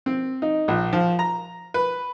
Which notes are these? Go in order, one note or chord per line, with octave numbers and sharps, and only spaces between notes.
C4
D#4
A#1
F3
A#5
B4